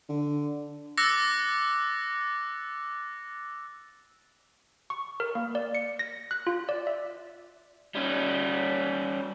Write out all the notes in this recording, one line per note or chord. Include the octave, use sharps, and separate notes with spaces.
D3
D6 E6 F#6 A6 A#6 C#7
C#6
A#4
A#3
D5
C#7
A#6
F#6
F4
D5
E5
G3 C#4